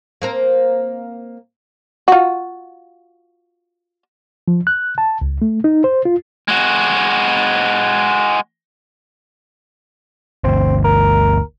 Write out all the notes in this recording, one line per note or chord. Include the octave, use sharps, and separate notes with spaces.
A#3 C4 A#4
F4 F#4
F3
F#6
A5
C#2
A3
D#4
C5
F4
G#3 F#4
G1 D2 C4
A#4